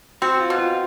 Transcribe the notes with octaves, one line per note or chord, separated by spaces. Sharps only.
C4 F#4
F4
B2
F4